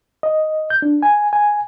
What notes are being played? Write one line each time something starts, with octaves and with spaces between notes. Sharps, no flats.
D#5
G6
D4
G#5
G#5